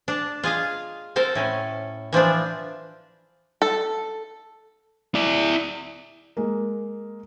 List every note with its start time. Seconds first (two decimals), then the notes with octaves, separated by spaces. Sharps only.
0.08 D4 A5
0.43 F4 G#4 D#5 F5
1.16 C4 A4 A#4 C5
1.35 A2 C#4
2.13 E3 F3 C4 D4
3.62 A4
5.15 E4 D5
6.37 G#3 A#3